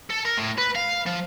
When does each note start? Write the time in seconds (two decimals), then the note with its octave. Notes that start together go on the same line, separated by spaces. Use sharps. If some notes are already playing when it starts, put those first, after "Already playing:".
0.10 A4
0.25 A#4
0.37 A2
0.58 B4
0.76 F5
1.07 F3